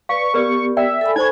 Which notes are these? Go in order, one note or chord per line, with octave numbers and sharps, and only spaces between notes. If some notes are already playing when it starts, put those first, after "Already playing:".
B4 D5 F5 C#6
B3 G4 A#4 B4 D5
D5 E5 G5
A4 G#5 B5
D#4 C5 C#6 G#6